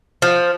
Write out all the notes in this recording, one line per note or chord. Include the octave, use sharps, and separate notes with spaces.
F3